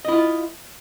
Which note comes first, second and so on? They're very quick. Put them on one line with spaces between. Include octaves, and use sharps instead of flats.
D#5 E4 F4